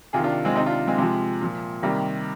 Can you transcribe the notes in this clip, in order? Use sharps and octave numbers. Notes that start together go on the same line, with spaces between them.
C3 D#3 F4 G#4
D4 F4
G#3 C4
C3 D#3 C4 D#4
D4 F4
G#3 C4
C3 F3 G#3
A#2 F3
C3 D#3 G3 A#3